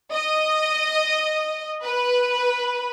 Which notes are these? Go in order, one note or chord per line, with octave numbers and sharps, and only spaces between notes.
D#5
B4